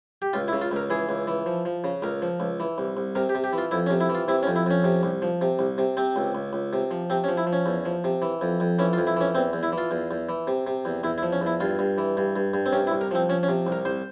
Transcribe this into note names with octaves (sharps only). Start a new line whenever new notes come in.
G4
C#2 F4
E4
C#3
F4
C#2 A#4
E3 G#4
C#2
E3
F3
F3
C#3
C#2 A#4
F3
C#2
E3
C2
C2
C3 A#4
G4
C3
G4
E3
F4
F2 E4
C#4
C3
E4
E3
F4
C3 E4
C#4
F2
E4
F2 C#4
C3
C2
F3
C3
C2
C3
C3 C4
C#2
C#2
C#2
C3
F3
C3 C4
C#4
F3
E4
F3
C#4
E2
F3
C3
E3
F2
F2
E3 C#4
F4
F2
E4
E3 C#4
E2 C4
E2
E4
E3
F4
E2
E2
E3
C3
C3
E2
E2 E4
E4
F3
C#4
E2
E4
G2 F4
G2
E3
G2
G2
G2
C4
C3 C#4
E4
C2
A#4
F3 C4
F3 C#4
C#4
C3
C2
A#4
C2 C5